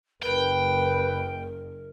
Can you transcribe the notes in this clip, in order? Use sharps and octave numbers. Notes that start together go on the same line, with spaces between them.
F#1 A#4 B4 G5